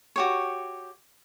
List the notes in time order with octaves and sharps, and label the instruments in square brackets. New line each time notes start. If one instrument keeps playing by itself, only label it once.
[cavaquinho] F#4 G4 C#5